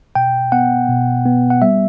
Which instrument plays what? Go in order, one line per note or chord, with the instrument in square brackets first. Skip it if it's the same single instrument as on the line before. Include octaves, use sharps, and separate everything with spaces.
[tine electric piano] B2 G5
B3 F#5
B2
B3
F#5
G3 E5